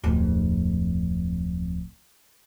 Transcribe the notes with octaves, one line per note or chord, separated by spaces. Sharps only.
D1 F2